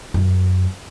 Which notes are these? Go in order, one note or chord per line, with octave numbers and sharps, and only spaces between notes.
F#2